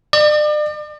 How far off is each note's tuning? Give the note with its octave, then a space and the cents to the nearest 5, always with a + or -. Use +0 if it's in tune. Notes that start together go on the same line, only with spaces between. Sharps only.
D5 +40